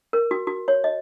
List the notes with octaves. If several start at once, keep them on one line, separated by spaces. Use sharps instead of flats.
A#4
F#4
F#4
C#5
D#5